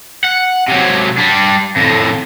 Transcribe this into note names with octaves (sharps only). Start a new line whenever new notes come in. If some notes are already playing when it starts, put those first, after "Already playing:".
F#5
C3 F#3
G3 D4
F2 A2